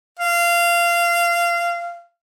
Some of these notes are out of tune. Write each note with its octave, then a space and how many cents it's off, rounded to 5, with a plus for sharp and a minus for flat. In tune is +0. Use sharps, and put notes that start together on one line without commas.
F5 -20